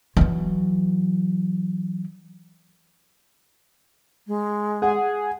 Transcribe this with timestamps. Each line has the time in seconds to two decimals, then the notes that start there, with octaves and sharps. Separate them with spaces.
0.17 E3 F#3
4.27 G#3
4.82 G#4 F#5